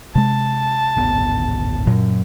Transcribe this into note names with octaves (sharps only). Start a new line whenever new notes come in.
C3 G#3 A5
D1 G#1 B3
F#2 A#2 F#3